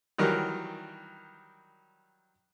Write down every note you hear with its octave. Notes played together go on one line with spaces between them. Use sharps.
D#3 E3 F#3 G3 G4 A#4